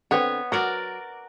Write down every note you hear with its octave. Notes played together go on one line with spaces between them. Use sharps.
D3 B3 C4 C#5
F#3 F#4 A#4 D5